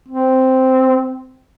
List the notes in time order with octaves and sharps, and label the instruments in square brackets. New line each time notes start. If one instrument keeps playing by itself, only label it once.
[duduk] C4